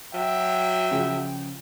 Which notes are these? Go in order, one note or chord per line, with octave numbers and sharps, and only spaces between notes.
F#3 E5 G5
C#3 F3 G#4